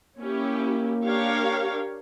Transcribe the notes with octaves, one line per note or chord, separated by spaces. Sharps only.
A#3 C#4 E4 G4
D4 G4 A#4 C#5 F5